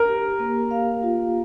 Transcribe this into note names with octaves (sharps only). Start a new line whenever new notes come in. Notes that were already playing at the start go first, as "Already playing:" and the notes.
Already playing: A#4
G4
A#3
F5
F4